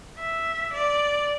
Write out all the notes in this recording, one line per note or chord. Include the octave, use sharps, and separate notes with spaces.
E5
D5